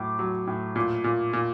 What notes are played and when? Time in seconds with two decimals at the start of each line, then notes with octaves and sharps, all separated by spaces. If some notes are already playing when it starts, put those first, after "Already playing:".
Already playing: A2 F#3 D6
0.19 F#3
0.47 A2
0.76 A#2
1.04 A#2
1.33 A#2